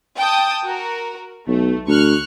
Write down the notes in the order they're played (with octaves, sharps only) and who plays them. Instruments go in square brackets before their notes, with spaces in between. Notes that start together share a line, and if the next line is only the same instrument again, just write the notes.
[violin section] G5 A5 D#6
F#4 A#4
[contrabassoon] B1 [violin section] A3
[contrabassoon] D2 [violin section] C#6 F6 F#6